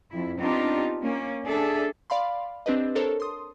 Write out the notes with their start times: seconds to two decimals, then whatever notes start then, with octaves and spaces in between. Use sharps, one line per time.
0.11 F2 E4
0.40 B3 C4 D4 D#4 F4 G4
1.01 A#3 C#4
1.45 D4 G#4 A4 E5
2.10 D5 F5 B5 C6
2.66 C4 D4 G4 B4 D#5
2.95 D4 A4 A#4 C5 C#5 A5
3.20 C6 D#6